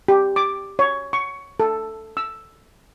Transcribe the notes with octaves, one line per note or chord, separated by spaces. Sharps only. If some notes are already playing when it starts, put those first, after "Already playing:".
G4
D6
C#5
C#6
A4
E6